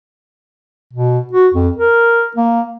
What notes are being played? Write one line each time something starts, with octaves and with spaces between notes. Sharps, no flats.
B2
F#4
F2
A#4
A#3